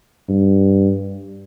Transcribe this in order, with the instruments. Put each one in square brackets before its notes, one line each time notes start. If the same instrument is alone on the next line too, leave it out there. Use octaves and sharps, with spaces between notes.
[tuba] G2